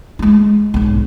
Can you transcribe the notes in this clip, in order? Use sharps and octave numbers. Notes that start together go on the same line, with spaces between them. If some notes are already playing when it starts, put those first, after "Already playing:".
G#3 F4
B1 G#2